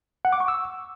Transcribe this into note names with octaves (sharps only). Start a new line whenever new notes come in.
F#5
D6
C#6
E6